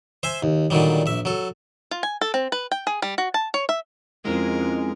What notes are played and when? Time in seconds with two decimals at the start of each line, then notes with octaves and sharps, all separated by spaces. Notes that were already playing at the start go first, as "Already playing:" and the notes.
0.23 C5 E5 G#5
0.43 D#2
0.70 A#2 D3 D#3 F#3 G3
1.06 A#1 E5
1.25 F#3 A4
1.91 F4
2.03 G#5
2.21 A4
2.34 C4
2.52 B4
2.71 G5
2.87 G#4
3.02 G3
3.18 F#4
3.34 A5
3.54 C#5
3.69 E5
4.25 F2 G#3 C4 C#4 E4 A#4